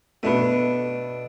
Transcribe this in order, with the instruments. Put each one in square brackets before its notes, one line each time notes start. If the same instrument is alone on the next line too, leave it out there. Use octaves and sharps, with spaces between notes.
[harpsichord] B2 D4 [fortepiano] A3 B3